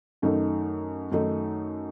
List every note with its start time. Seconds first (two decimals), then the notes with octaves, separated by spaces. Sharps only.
0.22 F#2 D#3 A3 D#4
1.12 F#2 D#3 A3 D#4